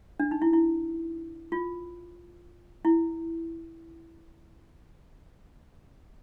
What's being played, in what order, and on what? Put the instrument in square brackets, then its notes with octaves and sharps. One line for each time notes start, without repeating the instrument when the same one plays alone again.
[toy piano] D4
D#4
E4
E4
F4
E4